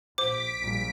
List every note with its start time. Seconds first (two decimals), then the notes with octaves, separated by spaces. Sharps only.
0.18 A#1 C5 D6 B6 D7
0.58 A#1 A#2 G3